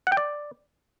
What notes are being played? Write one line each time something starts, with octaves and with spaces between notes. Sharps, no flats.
F#5
G5
D5